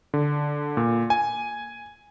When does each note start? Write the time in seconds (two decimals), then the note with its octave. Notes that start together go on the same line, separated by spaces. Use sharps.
0.14 D3
0.77 A#2
1.10 G#5